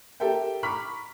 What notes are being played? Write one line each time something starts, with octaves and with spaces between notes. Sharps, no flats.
G4 A4 A#4 E5 G5
A#5 B5 C#6 D6 F6 B6